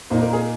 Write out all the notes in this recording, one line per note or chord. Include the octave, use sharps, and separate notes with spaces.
A#2 A#3 D#4 C5
A#4
G#4